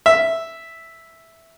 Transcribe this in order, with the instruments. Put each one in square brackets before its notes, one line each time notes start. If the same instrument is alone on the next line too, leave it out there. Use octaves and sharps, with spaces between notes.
[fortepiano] E5